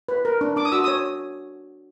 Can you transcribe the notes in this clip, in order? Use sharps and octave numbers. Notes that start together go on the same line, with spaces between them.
B4
A#4
D4
D4 D6
D#6
F#4 E6
C#5 D#6